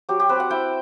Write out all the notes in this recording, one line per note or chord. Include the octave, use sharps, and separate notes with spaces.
F#3 G4
G4
C4 B4
F#5
E4 G5